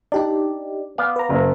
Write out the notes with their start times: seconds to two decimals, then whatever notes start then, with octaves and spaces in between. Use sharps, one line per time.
0.12 D4 D#4 G4 D5
0.98 B3 D5 F5
1.16 B4 A#5
1.29 F#1